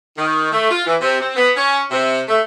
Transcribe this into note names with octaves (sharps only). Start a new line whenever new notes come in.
D#3
A3
F4
E3
C3
C4
B3
C#4
C3
A3